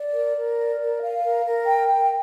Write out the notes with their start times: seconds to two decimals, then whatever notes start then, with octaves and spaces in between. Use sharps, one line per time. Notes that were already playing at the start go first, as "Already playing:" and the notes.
Already playing: D5
0.14 A#4
0.36 A#4
0.57 D5
0.80 A#4
1.02 F5
1.23 A#4
1.45 A#4
1.66 G5
1.87 G5